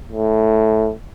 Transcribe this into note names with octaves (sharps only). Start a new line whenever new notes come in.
A2